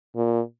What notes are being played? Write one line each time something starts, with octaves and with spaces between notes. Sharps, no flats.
A#2